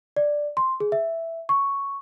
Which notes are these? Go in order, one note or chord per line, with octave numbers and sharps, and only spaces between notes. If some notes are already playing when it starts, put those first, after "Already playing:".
D5
C6
G#4
E5
C#6